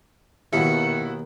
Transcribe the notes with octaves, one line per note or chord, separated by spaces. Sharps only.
D#2 B2 D#3 E4 F#4 C#7